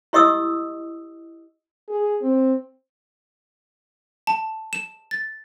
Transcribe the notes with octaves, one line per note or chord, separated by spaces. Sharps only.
E4 G4 D#5 C#6 D#6 E6
G#4
C4
A5
E7
A6